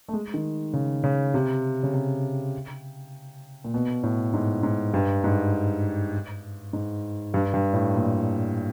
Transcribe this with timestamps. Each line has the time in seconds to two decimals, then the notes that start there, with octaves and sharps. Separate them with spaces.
0.08 A3
0.13 G#3
0.34 D#3
0.73 C#3
1.04 C#3
1.34 C3
1.83 C#3
1.94 C3
3.65 A#2
3.74 B2
4.03 A2
4.34 G#2
4.63 G#2
4.94 G2
5.24 G#2
6.73 G#2
7.34 G2
7.54 G2
7.73 A2
7.94 A#2